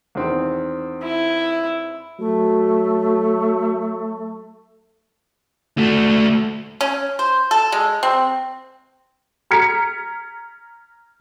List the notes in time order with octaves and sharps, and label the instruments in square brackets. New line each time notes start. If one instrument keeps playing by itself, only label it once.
[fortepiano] E2 D#3 C4
[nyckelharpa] E4
[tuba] F#3 [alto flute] A3
[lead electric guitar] A3 F#4
[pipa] C#4
C5
A4
G#3
C4
[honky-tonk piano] A#5 F6 G#6 B6 C#7